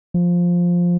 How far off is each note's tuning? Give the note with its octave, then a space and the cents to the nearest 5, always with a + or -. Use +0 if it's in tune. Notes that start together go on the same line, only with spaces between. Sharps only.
F3 +5